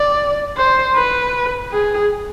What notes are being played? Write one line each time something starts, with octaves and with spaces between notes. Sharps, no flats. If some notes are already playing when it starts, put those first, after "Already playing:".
Already playing: D5
C5
B4
G#4